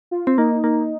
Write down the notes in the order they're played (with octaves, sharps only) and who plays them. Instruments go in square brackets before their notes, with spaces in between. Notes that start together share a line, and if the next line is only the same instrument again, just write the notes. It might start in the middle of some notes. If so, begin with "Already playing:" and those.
[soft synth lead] F4
[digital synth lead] C4
[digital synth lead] A#3 [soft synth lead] D#4
[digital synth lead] A#3